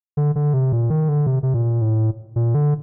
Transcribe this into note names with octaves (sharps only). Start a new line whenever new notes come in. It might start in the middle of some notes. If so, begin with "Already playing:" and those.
D3
D3
C3
A#2
D#3
D3
C3
C3
A#2
A2
A#2
D3